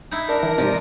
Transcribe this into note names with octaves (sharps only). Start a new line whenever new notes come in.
D#4 E4
D4 A#4
E3
G#2 C3 F3